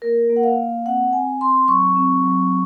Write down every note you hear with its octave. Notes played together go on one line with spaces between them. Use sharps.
A#3 A#4
A#3
F#5
F5
A#3
C4 F#5
C4 G#5
C4 C6
F#3 C#6
C4
F#3